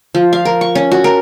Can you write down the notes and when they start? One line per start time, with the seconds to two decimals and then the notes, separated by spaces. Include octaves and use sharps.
0.15 F3
0.33 F5
0.45 A#4
0.61 C#6
0.75 C#4
0.92 F#4
1.04 A#4